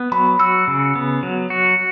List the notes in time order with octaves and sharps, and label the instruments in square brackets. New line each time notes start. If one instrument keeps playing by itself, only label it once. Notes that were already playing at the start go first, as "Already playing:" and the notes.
Already playing: [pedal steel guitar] B3
[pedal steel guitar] F#3 [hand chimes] B5
[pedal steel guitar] F#4 [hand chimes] E6
[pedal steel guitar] C#3
B3
F#3
F#4